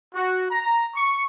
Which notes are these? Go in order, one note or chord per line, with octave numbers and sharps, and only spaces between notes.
F#4
A#5
C#6